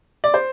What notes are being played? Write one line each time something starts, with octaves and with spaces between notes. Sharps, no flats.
D5
C5